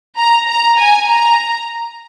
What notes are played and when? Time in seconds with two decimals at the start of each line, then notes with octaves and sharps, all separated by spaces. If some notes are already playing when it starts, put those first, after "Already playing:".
0.17 A#5
0.48 A#5
0.78 G#5
1.08 A#5